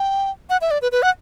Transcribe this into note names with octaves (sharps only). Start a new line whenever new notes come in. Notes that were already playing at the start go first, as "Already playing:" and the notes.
Already playing: G5
F#5
E5
D5
B4
B4
F#5